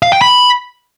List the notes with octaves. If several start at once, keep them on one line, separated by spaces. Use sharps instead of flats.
F5
G5
B5